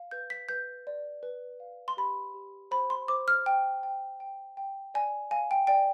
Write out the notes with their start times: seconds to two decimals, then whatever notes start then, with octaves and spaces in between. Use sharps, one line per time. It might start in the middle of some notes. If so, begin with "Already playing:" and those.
Already playing: F5
0.11 B4 G6
0.30 B6
0.49 B4 G6
0.87 D5
1.23 B4
1.60 F5
1.88 C6
1.97 G4 B5
2.34 G4
2.71 C5 B5
2.90 C6
3.08 C5 D6
3.28 F6
3.46 G5
3.83 G5
4.20 G5
4.57 G5
4.94 D5 G#5
5.31 F5 G#5
5.51 G5
5.67 D5 G5